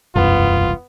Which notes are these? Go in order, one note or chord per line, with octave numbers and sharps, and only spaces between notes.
E1 C2 F#2 B3 F4